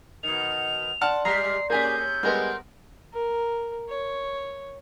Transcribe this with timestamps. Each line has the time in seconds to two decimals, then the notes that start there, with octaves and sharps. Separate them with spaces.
0.23 B2 D#3 F7
1.01 D5 F#5 A5 C6 F6
1.25 G3 G#3 G4 A#5 C7
1.70 A#3 C#4 G4 G#4 G#5 G6
1.98 C3
2.23 G3 G#3 B3 C4 A#4 F#5
3.13 A#4
3.89 C#5